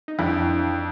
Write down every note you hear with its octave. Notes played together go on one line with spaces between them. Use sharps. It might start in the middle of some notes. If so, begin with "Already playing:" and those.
D#4
F2 D4 E4